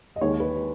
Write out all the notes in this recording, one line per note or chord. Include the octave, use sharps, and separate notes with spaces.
D#5
D#2 D#3 G#3 C#5
B4